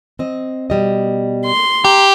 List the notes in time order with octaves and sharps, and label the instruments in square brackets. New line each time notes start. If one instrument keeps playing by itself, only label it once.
[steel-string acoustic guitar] C4 D#5
B2 G3 D#5
[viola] C6
[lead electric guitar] G4 [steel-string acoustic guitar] A#5